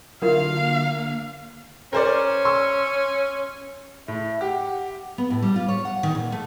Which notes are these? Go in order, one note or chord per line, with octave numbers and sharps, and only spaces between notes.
D3 F#3 A#3 D4 E4 F4 A#4 F5
C#4 A#4 C5 D5
C6 C#6 E6
A2 E5
G4 F#5
B3
A2
G3
F4
C#5
F#5
D#3
A#2
A3